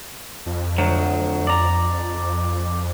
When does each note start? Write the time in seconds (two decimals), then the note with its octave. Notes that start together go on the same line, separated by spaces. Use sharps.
0.46 F2
0.78 D2 F#3
1.47 D5 A#5